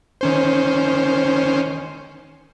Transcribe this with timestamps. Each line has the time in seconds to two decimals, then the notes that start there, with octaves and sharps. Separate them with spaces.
0.21 D#3 C#4 C5